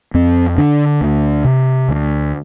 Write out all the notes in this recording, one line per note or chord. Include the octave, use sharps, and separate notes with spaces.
F2 C4
D3 D4
D2
C3
D2